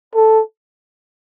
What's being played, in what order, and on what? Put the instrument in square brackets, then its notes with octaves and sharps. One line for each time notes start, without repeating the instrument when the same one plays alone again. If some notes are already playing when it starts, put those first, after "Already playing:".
[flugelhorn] A4